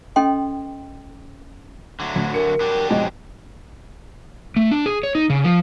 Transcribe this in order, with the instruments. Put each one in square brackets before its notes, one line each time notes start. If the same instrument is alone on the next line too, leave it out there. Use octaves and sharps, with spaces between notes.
[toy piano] C#4 A4 D#5 G5 C6
[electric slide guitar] D3 F#3 A3
[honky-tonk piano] D2
[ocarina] A#4 [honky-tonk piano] C#7
[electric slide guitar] F#3 D4 G4
[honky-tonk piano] F2 B2 G#3 [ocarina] D#5
[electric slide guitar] A3
D4
G#4
C#5
D#4
C#3
F3